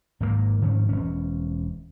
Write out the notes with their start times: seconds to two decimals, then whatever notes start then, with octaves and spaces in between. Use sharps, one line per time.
0.20 G#1 G#2 B2 A#3
0.62 G#2 D#3 F3 C#4
0.89 E1 C#4